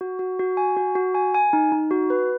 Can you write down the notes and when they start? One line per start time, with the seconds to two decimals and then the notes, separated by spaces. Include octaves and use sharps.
0.01 F#4
0.19 F#4
0.39 F#4
0.57 G#5
0.77 F#4
0.95 F#4
1.15 G#5
1.34 G#5
1.53 D#4
1.72 D#4
1.91 F#4
2.10 B4